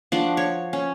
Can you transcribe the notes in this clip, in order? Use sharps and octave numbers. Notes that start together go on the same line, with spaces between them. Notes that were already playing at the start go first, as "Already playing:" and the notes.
F3 D4 F#4
C#5
C#4